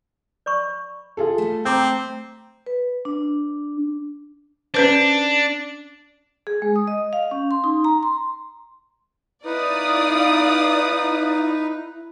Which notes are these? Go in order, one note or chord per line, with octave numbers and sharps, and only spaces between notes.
D5 B5 C#6
F4 G#4 A4
G3 A3
C4 A#5 D6 E6 G6
B4
D4
C#4 D4 B4 C5
G#4
G#3
D#6
D#5
F5
C#4
C6
D#4
A#5
C6
D#4 E4 B4 D5 F5 D#6